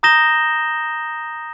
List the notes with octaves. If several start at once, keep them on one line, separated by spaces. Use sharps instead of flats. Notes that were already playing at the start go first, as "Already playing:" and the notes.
A#5 D#6 G6 A#6 E7 G7